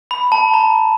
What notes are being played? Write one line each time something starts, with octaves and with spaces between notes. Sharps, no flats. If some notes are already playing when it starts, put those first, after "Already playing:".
B5
A5
A#5